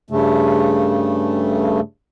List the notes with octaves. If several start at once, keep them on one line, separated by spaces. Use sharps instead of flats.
G2 C#3 A3